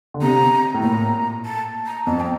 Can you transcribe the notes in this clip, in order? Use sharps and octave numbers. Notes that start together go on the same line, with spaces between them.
D3
C3 A#5
A2
A#2 A#5
A5
A#5
F2 A5
G5